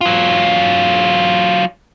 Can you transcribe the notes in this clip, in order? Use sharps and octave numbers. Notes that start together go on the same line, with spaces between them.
F#3 F4